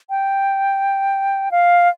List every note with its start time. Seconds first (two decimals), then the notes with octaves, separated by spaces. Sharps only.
0.10 G5
1.51 F5